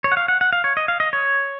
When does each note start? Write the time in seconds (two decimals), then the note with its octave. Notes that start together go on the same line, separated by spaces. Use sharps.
0.04 C#5
0.12 F#5
0.17 F5
0.28 F#5
0.41 F#5
0.53 F5
0.64 C#5
0.77 D#5
0.88 F5
1.00 D#5
1.13 C#5